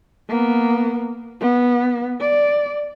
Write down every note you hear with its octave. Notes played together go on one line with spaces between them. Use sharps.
A#3 B3
B3
D5